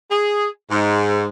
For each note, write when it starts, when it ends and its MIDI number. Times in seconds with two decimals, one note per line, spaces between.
0.11 0.48 68
0.71 1.26 44